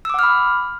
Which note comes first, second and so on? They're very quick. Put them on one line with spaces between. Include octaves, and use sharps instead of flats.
E6 D6 F#5 F6 B5